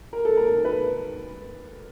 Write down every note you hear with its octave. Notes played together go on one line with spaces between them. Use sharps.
A#4
A4
A#4
B4